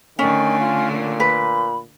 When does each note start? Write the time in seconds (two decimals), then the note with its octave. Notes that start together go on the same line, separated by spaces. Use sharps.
0.19 D3 D#3 A3 C#4 G#5
0.59 F4
0.91 A#2
1.20 B4 B5